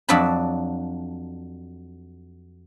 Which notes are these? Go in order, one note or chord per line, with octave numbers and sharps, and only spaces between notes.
F2 F#3 D4 A5 B5